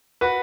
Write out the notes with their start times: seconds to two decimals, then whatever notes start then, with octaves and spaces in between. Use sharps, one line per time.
0.21 F#4 B4